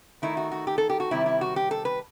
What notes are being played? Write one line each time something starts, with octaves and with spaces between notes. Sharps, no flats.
D#3 A3 D#4 E4
F#4
F#4
G4
A4
G4
F#4
C3 D#3 G3 C4 E4
E4
F#4
G4
A4
B4